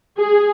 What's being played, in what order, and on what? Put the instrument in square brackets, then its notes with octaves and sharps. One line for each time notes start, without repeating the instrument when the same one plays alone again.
[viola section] G#4